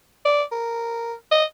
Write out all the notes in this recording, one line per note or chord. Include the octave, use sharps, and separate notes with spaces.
D5
A#4
D#5